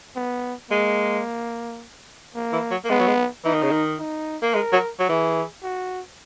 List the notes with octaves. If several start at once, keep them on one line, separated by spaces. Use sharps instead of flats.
B3
G#3 A#3
A#3
E3
F#3
A#3
G#3 B3
F#3
G#3
E3 D#4
D#3
C#3
D#3
D#4
A#3
G#3 A#4
F#3
F#3
E3 G#4
F#4